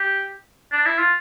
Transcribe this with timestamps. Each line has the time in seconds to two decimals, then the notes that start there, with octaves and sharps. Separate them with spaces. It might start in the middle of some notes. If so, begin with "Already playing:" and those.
Already playing: G4
0.72 D4
0.86 E4
0.99 F4